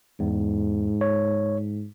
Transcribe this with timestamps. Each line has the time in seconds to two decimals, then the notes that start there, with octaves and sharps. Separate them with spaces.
0.20 E2 G#2
1.01 C#5